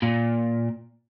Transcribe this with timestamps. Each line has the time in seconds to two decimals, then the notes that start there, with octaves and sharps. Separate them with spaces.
0.02 A#2